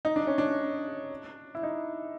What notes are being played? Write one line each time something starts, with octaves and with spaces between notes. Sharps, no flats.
D#4
D4
C#4
D4
E4
D#4